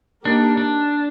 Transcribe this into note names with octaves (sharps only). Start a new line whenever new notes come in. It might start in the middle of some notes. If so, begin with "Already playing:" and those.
A#3 D4 D#4 G4 A#4
D4